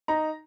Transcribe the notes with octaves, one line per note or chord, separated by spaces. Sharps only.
D#4 A#5